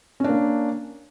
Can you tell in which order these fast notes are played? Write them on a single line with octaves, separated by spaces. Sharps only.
C#4 D4 A#3